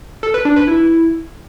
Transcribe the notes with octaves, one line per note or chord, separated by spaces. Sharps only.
A4
B4
D4
B4
E4